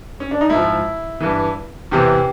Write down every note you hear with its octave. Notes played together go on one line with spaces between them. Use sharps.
C#4
D4
D#4
G#2 F3 E4
G2 E3
E2 C3 E3 G4